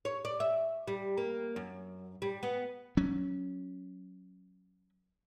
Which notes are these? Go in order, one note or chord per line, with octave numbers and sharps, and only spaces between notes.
C#5
D5
E5
G3
A#3
F#2
G3
B3
F#3 C#4